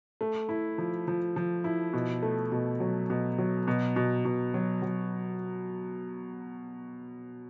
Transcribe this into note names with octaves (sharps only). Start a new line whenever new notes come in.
A3
E4
F3
F3
F3
E4
B2
A3
B2
F#3
B2
F#3
B2
B2
B2
F#3
F#3